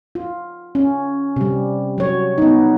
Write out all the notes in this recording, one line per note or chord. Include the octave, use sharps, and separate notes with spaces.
F4
C#4
C3 G3
F#3 C#5
B3 D#4